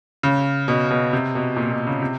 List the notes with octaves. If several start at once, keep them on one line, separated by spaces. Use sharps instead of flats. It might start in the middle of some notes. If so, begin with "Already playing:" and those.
C#3
B2
B2
C3
B2
A#2
B2
C#3
C3